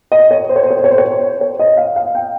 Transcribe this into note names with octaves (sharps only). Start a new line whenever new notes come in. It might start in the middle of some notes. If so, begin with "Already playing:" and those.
D#5
C#5
C5
C#5
C5
C#5
C5
C#5
C5
C#5
C5
C#5
D#5
F5
F5
G5